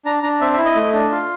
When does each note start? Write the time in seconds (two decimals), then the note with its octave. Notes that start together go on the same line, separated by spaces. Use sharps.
0.05 D4 A#5
0.23 D4 A#5
0.41 C4 E5
0.53 E5
0.58 E4
0.65 D#5
0.76 A3
0.93 D4
1.11 F4